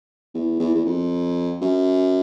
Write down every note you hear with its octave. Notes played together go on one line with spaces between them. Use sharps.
E2
E2
E2
F2
F#2